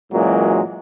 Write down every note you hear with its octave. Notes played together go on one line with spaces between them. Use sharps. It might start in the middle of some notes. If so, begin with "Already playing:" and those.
F#2 A#2 E3 F#3 G#3